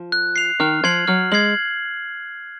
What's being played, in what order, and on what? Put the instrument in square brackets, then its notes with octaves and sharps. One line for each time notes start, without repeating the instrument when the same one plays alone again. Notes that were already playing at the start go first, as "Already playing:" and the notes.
Already playing: [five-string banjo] F3
[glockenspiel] F#6
C7 F7
[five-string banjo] D#3 [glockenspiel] F6
[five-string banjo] F3 [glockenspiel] G#6 C7 F#7
[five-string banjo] F#3 [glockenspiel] F6
[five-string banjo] G#3 [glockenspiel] G#6 C7 F#7